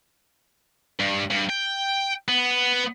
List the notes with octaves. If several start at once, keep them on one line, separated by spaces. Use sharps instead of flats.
G2
G2
G5
B3